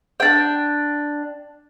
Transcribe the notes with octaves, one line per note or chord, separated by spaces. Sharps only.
D4 G5